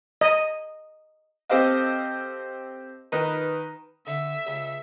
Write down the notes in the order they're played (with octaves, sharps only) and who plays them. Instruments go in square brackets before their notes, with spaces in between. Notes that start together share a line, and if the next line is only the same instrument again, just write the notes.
[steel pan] D#5
[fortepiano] C4 G4 A4 C5 D#5 F5
D#3 D#4 B4
[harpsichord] D3 [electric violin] E5
[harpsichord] C#2